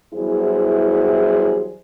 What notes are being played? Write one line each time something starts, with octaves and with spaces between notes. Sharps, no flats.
E2 F#3 G3 E4 G#4 C5